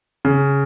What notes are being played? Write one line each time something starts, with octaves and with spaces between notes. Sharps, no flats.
C#3